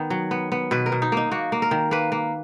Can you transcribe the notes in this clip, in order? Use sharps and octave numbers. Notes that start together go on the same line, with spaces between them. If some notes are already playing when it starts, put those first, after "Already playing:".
Already playing: D#3 B3 D#4
F#3
B3
B3
B2 B4
A#4
B2
D#4
A#3 D#4
A#3 F#4
A#3
A#4
D#3
A#3 B4
A#3